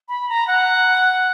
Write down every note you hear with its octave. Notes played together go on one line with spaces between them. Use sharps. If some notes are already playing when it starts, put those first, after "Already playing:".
B5
A#5
F#5